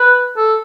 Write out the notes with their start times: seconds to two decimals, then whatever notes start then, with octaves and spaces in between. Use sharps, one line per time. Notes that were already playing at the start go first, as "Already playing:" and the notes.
Already playing: B4
0.37 A4